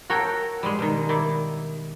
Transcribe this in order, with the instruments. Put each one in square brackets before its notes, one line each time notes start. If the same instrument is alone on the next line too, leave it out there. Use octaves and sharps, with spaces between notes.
[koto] F#4 A4 A#4 C#5 G5
G3 G#3
B2 D#3
D#3 E4 D5